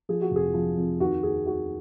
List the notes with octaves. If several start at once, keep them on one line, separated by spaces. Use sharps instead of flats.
F3 G#4
F#4
F1
G#4
F3
F2
D#2 F#4
D#2 G#4
D#3 F#4